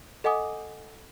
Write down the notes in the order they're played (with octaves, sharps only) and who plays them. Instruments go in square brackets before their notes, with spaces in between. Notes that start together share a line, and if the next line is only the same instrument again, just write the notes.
[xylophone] A4 D#5 F#5 G#5 D6 D#6